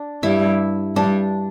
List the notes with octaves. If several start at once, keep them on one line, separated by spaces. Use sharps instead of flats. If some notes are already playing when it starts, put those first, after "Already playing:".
Already playing: D4
G2 G3 E4
G2 G3 D4